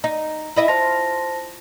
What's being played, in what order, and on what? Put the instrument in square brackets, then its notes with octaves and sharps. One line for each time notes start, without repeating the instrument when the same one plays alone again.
[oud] D#4 [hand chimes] A#5
[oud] E4 D#5 E5
[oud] F4 [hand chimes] C5 A5 A#6